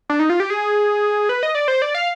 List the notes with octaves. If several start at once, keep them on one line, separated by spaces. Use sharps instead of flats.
D4
D#4
F4
G4
G#4
B4
D#5
D5
C5
D5
F5